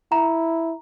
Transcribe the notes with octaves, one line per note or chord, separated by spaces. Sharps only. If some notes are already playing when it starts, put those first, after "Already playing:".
E4 A#5